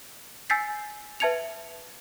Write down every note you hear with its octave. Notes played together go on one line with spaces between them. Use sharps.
G#5 E6 G6 A6 B6 C7
B4 E5 A5 G#6 C#7 F7